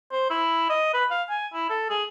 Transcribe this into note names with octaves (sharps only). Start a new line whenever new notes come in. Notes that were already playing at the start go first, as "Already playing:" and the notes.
C5
E4
D#5
B4
F5
G#5
E4
A4
G#4